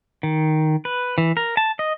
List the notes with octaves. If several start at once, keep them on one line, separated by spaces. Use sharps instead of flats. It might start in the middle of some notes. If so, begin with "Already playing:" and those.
D#3
B4
E3
A#4
A5
D#5